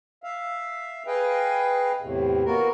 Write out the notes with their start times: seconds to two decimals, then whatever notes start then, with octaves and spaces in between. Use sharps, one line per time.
0.23 E5 F5
1.07 G#4 B4 D#5 F5 G5
2.01 E2 A2 C3
2.46 A#3 B3 F#4 A#4